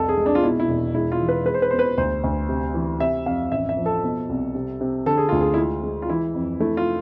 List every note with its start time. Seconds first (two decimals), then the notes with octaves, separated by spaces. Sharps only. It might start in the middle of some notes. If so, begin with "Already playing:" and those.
Already playing: F1 C2 A4
0.09 G#4
0.17 G#3
0.26 D4
0.35 F4
0.43 B2 E4
0.60 E4
0.68 E1
0.95 G#3 E4
1.12 F4
1.20 E3
1.28 B4
1.45 G#3 B4
1.54 C5
1.62 B4
1.70 E2 C5
1.79 B4
1.98 D2 C5
2.24 D2
2.49 C3
2.74 E3
3.00 C3 E5
3.26 F2 F5
3.52 A1 E5
3.69 E5
3.77 F3
3.86 A4
4.03 B2
4.29 C2
4.55 C3
4.81 C3
5.06 D3 A4
5.18 G#4
5.29 D2 F4
5.41 G#4
5.54 E4
5.57 G#3 F4
5.83 G#3
6.02 F4
6.09 E3 E4
6.34 F2
6.60 A3 E4
6.77 F4